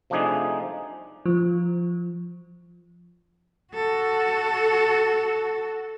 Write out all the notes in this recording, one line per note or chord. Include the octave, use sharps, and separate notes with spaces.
C3 F3 A3 D4 D#4 G#4
F3
F#4 A4